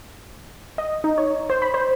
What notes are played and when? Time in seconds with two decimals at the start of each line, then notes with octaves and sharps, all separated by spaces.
0.78 D#5
1.04 D#4
1.18 C#5
1.50 C5
1.62 B5
1.74 C5